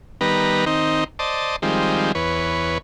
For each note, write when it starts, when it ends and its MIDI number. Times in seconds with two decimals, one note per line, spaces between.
0.21 0.65 51
0.21 0.65 55
0.21 0.65 59
0.21 0.65 71
0.21 0.65 82
0.66 1.04 51
0.66 1.04 60
0.66 1.04 63
1.19 1.56 72
1.19 1.56 74
1.19 1.56 75
1.19 1.56 81
1.62 2.12 51
1.62 2.12 53
1.62 2.12 55
1.62 2.12 56
1.62 2.12 60
2.15 2.78 40
2.15 2.78 71
2.15 2.78 73